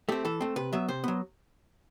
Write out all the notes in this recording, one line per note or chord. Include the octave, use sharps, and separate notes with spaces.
A3 C4 G4
E3 A4
A3 C4
C3 B4
F#3 B3 E5
C3 C5
F#3 B3